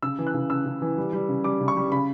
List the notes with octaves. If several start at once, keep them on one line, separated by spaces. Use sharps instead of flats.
C#3 E6
E3
F#6
C#3
C#3 E6
C#3
E3
G3
G3
C#3
G3 D6
C#3
C#6
G3
C#3 B5